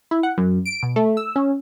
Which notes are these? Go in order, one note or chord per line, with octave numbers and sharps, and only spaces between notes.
E4
F#5
F#2
D7
B2
A3
E6
C#4